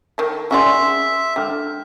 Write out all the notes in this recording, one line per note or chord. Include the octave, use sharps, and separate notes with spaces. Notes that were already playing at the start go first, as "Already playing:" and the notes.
D#3 A4
C#4 F#4 G#4 D5 E5 C6
D3 G5 F6